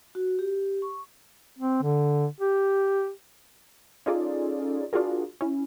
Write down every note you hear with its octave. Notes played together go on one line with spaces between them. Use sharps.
F#4
G4
C#6
C4
D3
G4
C#4 D#4 F4 G#4 A4 D5
D4 F4 F#4 G#4 A#4
C#4 E4